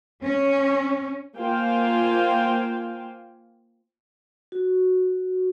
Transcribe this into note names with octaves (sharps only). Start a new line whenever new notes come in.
C#4
A#3 F4 C5 F5 G5 G#5
F#4